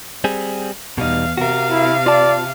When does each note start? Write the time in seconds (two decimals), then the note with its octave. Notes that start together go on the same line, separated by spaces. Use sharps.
0.24 G3 C4 G#4
0.98 E2 B2 G3 D#4 F5
1.38 C3 F#4 A#4 F5
1.71 E4
2.06 F4 D5 A5